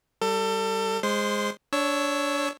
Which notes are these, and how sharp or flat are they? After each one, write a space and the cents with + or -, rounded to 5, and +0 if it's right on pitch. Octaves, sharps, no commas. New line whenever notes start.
G3 +0 A4 +30
G#3 -10 C5 +5 C6 -20
D4 -20 C#5 +0 E6 +0